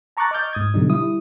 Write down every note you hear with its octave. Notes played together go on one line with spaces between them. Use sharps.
A5 A#5 C#6 D6 F#6 A6
D#5 C#6 D6 F6 G6 A6
G#2 D#6 G#6
B2 D3 F#3 G3 D#4
G3 E4 D#6